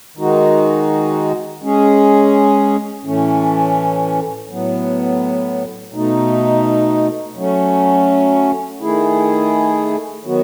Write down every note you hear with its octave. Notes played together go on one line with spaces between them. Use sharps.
D#3 G#3 D#4 F#4
G#3 C#4 G#4
A2 E3 A3 C#4
A2 F#3 B3
B2 A3 D#4
F#3 A3 C#4
D#3 A3 E4 G#4
D#3 F#3 B3 F#4